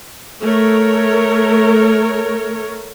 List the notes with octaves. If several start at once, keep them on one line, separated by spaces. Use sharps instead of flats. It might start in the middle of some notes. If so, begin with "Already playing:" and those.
A3 A#4 C#5